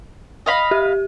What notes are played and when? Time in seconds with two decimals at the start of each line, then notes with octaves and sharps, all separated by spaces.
0.46 D#5 F5 B5
0.71 G4